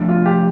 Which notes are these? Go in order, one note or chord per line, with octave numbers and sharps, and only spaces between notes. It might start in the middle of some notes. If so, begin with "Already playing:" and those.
Already playing: C3 F3 A3 D4
F4
G4